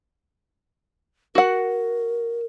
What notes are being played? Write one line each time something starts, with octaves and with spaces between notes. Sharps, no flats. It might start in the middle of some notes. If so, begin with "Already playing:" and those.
F#4 A#4 F#5